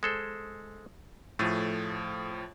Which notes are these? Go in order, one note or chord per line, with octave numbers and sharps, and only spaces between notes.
G#3 A4 C5
A2 F3 A3 G#4